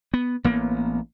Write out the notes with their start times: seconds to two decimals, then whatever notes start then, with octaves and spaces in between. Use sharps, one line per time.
0.14 B3
0.44 A1 A#3 B3